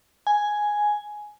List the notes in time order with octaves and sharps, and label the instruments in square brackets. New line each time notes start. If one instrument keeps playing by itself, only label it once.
[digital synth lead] G#5